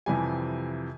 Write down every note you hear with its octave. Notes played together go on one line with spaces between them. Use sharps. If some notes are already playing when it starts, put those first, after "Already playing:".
F2 C3 E3 G3 G#5